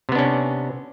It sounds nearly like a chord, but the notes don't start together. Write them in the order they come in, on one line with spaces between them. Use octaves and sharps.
C3 B3 D4 C#4